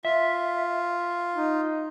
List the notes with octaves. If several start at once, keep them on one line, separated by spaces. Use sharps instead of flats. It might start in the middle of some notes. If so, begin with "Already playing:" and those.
F4 E5
D#4